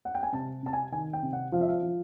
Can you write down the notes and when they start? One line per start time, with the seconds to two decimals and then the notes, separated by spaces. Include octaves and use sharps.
0.05 F#5
0.15 G5
0.23 G#5
0.33 C3 A5
0.63 C3 A5
0.73 G#5
0.92 D#3 G#5
1.13 G5
1.23 C3
1.33 F#5
1.52 F3 F5
1.61 E5
1.68 F5
1.83 F3